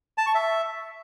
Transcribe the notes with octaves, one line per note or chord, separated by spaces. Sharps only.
A5
C#6
E5